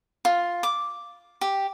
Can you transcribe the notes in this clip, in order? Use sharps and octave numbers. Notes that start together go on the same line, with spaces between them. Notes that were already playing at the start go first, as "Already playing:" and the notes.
F4
D6
G4